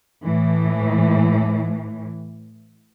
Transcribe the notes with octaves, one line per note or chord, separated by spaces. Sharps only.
A2 E3